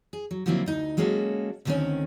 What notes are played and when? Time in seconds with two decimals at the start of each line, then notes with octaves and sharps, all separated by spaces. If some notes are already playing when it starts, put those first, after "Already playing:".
0.13 G#4
0.31 F#3
0.46 D3 F3 F#3 A#3 C4 E4
0.66 D2 D#4
0.97 F#3 G#3 A#3 C#4 F#4 A4
1.65 D2 D3 D#3 G#3 C4 C#4